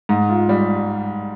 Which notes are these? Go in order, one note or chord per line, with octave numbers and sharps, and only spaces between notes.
G#2
F4
G3